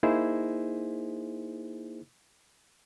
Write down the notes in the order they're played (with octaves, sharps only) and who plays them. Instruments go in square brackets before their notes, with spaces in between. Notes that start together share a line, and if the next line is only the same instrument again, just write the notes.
[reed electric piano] A#3 D#4 E4 G#4 C5